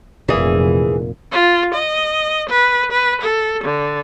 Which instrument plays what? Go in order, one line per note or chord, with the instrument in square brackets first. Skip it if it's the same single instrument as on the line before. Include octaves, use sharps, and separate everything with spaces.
[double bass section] F1 [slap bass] A#2 [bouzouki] E3 G#4
[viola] F4
D#5
B4
B4
A4
D3